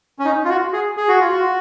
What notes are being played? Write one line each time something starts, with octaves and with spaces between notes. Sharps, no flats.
C#4
D#4
F4
F#4
G#4
G#4
F#4
F4
F#4